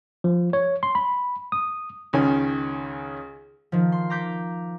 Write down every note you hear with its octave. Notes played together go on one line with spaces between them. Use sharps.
F3
C#5
C6
B5
D#6
C#2 D#3 C#4 G#5
D#3 F3
C6
A#5 D6 G6 B6